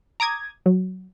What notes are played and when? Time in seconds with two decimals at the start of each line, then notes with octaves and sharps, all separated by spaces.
0.20 A#5 D6 D#6 G#6
0.66 F#3